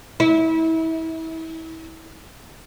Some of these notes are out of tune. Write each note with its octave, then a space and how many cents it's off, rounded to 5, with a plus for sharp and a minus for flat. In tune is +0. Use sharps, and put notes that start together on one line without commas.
E4 -30